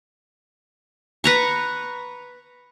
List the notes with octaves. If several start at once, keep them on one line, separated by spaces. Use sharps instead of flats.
B4 A#5 C#6